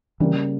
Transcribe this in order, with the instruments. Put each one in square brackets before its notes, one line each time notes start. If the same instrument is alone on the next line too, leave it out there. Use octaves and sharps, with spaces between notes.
[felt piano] C#3 G3 A#3 [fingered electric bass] E3